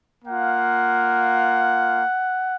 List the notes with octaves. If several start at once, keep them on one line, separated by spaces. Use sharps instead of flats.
A#3 F4 F#5